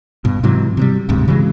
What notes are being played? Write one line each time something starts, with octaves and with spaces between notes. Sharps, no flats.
G2 B2
G#2 C3 E3 F#3
C3 F#3 G3
D1 D2 G#2 C3
C#3 E3 F#3 G#3